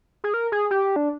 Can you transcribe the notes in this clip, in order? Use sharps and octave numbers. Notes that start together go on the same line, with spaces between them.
G#4
A#4
G#4
G4
D4